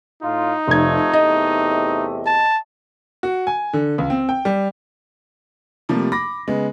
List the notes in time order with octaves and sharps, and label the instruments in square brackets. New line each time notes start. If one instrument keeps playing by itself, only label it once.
[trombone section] A2 F4 [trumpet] D#4
[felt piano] F1 G#6 [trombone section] C3 F3 A3
[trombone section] E2 C3 A3 [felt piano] D#5
[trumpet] A5
[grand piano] F#4
G#5
D3
C#2
C4
G5
G3
[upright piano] C3 F3 G3 A3 A#3
B5 D6 A#6
C#3 G#3 B3